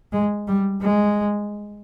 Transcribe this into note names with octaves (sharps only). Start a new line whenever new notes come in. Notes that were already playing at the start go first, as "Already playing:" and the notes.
G#3
G3
G#3